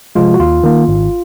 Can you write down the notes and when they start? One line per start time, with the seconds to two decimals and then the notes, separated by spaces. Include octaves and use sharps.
0.15 C3 F3 G#3 F4
0.34 F#4
0.40 D#2 F4
0.63 D#3 A#3
0.88 G#1